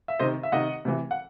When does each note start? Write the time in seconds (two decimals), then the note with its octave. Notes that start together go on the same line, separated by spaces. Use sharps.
0.08 E5
0.19 C3 D#3 C5 D#5
0.43 E5
0.52 C3 D#3 D#5 F#5
0.85 C3 E3
1.11 F#5